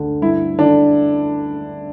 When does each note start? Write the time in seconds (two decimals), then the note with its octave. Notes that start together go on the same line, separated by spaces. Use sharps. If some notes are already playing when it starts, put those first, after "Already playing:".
Already playing: D2 D3
0.22 G2 E4
0.59 D3 D4